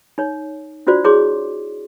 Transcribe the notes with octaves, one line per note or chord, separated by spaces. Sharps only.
D#4 C#5
D4 F4 F#4 C5 D5
E4 G#4 C#5 C6 D6